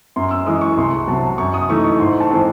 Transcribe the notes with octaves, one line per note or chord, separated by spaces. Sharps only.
F#2 C6
E6
E3 G#3 D#6
C#6
C2 C6
C3 F#3 A5
F#2 C#6
D#6
E3 A3 D#4 C#6
C#6
G#2 C6
A5
E3 G#3 C4